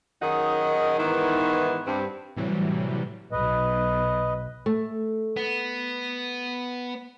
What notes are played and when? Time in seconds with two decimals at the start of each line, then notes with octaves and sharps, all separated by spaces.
0.22 F#2 D#3 D#4 G#4 D#5 F#5
0.98 G#2 D#3 E3 B3 D#4 E4
1.86 G2 C4
2.36 A2 C3 E3 F#3 G3
3.32 B1 B4 D#5
4.66 A3
5.36 B3